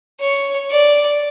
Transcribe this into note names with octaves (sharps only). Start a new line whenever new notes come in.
C#5
D5